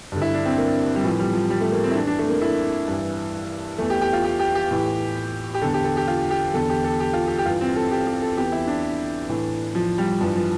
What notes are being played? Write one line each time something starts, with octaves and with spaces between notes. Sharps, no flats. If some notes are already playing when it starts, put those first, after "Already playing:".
G2 D3
E4
D4
C4
A#3
G3
A2 E3 F3
G3
F3
G3
A3
A#3
C4
E4
F2 E3 D4
D4
A3
A#3
E4
G2 E3
E2 E3 A3
G4
G4
F4
G4
G4
G4
A2 E3
G4
E2 D3 A4
G4
A4
G4
F4
G4
E2 D3 A4
G4
A4
G4
F4
G4
G4
G2 E3 F4
C4
A4
G4
G4
A4
E2 E3 G4
E4
D4
A2 E3
F3
G3
G2 E3 F3
F3